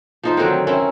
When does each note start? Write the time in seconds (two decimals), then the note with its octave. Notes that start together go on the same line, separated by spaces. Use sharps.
0.23 F3 D#4 C5
0.37 D3 D#3 F#3 C4
0.67 C4 C#4 E4 A#4